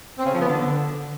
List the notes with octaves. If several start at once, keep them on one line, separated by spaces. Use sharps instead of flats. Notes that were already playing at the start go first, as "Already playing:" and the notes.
C4
C#3
F3
B3
D3